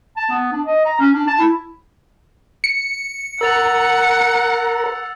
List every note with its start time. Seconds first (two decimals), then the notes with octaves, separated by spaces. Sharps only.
0.17 A5
0.30 B3
0.52 D4
0.65 D#5
0.85 A#5
0.99 C#4
1.14 D4
1.27 A5
1.39 E4
2.64 C#7
3.41 A#4 F#5 A#5 E6 A6 F7